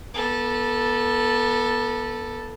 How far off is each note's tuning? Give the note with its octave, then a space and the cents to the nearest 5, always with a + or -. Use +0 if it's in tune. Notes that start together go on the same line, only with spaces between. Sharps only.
B3 -30 A4 +0